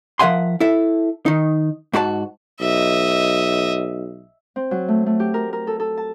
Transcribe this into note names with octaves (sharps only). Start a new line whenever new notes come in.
F3 A#4 E5 F#5 G#5 C6
E4 A4 E5
D#3 D#4
G#2 F#4 C5 A5
B1 D#5 E5
C4
F#3
A3
A3
G4
A#4
A#4
A4
A4
A5